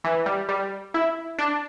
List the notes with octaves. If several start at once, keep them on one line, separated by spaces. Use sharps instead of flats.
E3
G3
G3
E4
D4